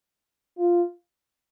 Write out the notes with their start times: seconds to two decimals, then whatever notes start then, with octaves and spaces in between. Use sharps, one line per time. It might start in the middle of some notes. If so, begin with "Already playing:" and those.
0.58 F4